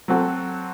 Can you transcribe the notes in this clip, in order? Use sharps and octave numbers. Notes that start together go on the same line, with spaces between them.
F#3 C4 F#4 A4